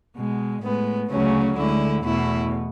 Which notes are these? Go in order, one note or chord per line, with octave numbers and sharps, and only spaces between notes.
B2 G#3
A2 G#3 B3
D2 C#3 F#3 A3 C#4
D2 D3 G#3 E4
E2 B2 A3 E4